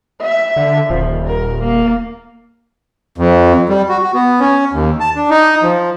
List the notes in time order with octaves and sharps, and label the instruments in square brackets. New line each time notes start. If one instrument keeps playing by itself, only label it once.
[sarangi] E5
[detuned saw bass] D3
[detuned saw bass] D#1 [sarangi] F3
[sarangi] A#4
A#3
[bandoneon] F2
G3
F#4
F#4
B3
C#4
D#2
A5
D4
D#4
F3